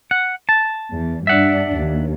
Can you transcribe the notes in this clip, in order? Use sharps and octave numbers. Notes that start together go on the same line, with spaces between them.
F#5
A5
E2
G2 D4 E5 F#5
D#2